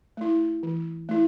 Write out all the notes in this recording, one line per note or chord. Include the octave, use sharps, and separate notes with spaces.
A3 E4
E3
A3 E4